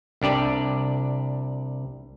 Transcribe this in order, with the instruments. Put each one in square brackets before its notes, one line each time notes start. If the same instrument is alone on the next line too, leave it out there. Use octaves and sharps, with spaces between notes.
[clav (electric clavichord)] C2 D4 G4 D5